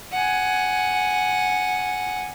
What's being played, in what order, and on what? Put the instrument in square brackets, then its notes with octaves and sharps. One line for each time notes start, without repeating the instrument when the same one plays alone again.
[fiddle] F#5 G#5